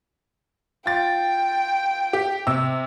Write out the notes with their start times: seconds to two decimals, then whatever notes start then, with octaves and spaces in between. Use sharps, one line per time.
0.86 F4 G5 A6
2.13 G4
2.47 C3 E6